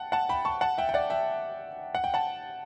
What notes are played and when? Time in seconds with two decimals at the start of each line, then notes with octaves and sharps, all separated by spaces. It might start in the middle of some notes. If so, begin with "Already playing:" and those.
Already playing: F#5 G5 A5
0.12 F#5 A5
0.29 G5 B5
0.45 A5 C#6
0.61 F#5 A5
0.78 E5 G5
0.89 G5
0.94 D5 F#5
1.10 E5 G5
1.95 F#5
2.04 G5
2.14 F#5 A5